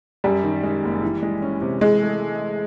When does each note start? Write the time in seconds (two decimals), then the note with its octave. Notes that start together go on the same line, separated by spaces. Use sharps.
0.24 F#2 G3
0.43 D#3
0.63 G#3
0.83 F#1
1.02 E3
1.23 G#3
1.42 C#4
1.62 C3
1.81 E3 G#3
2.01 A3